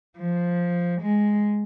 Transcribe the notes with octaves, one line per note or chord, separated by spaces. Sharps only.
F3
G#3